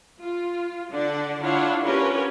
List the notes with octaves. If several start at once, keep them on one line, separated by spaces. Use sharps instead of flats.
F4
D3 D4 D5 F#5
D4 E4 F4 C#5 F5 F#5
C#4 F4 G4 A#4 B4 C#5